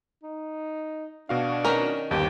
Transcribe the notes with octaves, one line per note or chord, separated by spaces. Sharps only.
D#4
B2 D4 F#4 F5
D#3 C#4 A#4
G1 D#2 G4